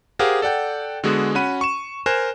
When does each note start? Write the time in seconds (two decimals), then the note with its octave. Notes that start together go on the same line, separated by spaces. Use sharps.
0.19 G4 G#4 A#4 C5 F5 F#5
0.42 A4 D5 F#5 G5
1.03 D3 G#3 B3 F#4 G#4
1.35 C#4 F#4 F#5 B5 D#7
1.61 C#6 E7
2.06 A#4 C5 G#5 F#6 E7